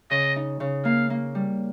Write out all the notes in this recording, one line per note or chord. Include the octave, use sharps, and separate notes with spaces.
C#3 D#5
D#4
C#3
A#3 F5
A#3
G3